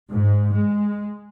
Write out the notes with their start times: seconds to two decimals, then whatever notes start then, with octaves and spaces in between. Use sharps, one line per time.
0.10 G#2
0.52 G#3